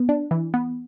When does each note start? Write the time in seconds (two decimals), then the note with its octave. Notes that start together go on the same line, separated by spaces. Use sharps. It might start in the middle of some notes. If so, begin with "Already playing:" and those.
Already playing: B3
0.09 D4
0.31 E3
0.54 B3